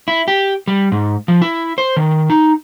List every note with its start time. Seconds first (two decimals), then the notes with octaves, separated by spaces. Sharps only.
0.08 E4
0.28 G4
0.68 G3
0.92 G#2
1.28 F3
1.42 E4
1.78 C5
1.97 D#3
2.30 D#4